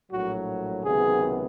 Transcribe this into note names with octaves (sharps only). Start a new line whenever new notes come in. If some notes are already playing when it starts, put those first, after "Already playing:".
A#1 A2 F#3 F#4
C#2 C3 D#3 F#3 B3 G#4